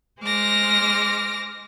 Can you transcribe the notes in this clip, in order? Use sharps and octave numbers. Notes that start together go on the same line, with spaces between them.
G#3 C5 D6 F6 A#6